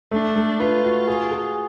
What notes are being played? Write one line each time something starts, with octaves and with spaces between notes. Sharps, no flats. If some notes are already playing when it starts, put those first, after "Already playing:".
A3 D4
A3
F4 B4
F#4
G#4
G#4